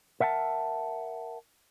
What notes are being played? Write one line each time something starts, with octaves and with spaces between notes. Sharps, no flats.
A#4 E5 F#5 G5 A5